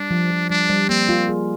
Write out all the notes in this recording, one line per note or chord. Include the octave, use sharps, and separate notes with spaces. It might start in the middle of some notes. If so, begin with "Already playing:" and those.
Already playing: G3 D4
F3
F3
G3 D4
G3
A#3 C4
F4
G#4